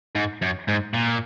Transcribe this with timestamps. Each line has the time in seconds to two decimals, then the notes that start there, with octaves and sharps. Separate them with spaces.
0.15 G#2
0.42 F#2
0.68 G#2
0.94 A#2